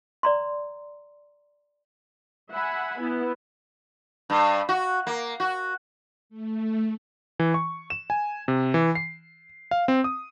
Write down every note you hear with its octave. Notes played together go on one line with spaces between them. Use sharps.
D5 A#5 C6
E5 F#5 G#5 B5
B3 E4
G2
F#4
A#3
F#4
A3
E3
C#6
E7
G#5
C3
E3
C7
F5
C4
D#6